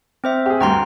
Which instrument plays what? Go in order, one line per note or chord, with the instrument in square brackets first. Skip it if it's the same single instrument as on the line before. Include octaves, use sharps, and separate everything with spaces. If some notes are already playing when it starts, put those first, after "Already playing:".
[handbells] C4 C5 E5
[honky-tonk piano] G4 G#4
[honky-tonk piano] D2 G2 [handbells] G5 A#5 C6